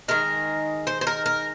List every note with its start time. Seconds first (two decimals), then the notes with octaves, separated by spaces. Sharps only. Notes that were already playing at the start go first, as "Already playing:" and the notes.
0.08 D#3 G#3 A#4
0.87 C5
1.01 C5
1.07 A#4
1.26 A#4